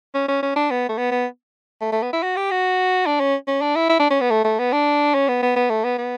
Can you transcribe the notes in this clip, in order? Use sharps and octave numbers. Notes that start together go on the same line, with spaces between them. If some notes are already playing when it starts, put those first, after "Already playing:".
C#4
C#4
C#4
D4
B3
A3
B3
B3
A3
A3
B3
E4
F#4
G4
F#4
D4
C#4
C#4
D4
E4
E4
D4
C#4
B3
A3
A3
B3
D4
C#4
B3
B3
B3
A3
B3
B3